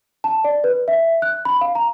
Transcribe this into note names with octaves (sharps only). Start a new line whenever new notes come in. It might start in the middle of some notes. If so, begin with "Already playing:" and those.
A5
D5
B4
E5
F#6
B5
F5
A#5